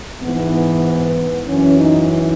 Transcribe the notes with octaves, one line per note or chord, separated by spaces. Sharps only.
G#2 E3 B3
F#2 E3 C#4
D#4